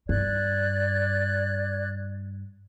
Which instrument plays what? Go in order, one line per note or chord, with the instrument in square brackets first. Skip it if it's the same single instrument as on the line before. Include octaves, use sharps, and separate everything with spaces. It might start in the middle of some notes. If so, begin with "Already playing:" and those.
[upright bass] G2 [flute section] D5 F#6 G#6